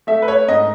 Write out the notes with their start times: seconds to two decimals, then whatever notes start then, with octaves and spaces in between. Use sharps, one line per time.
0.07 A3 E5
0.22 B4
0.28 C#5
0.48 G#2 D#5